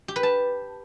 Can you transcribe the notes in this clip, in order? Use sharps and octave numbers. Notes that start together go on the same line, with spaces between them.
G4
B4
A5